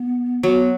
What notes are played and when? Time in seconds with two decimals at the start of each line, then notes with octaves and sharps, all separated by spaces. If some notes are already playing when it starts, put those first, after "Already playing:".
Already playing: B3
0.43 F#3 B3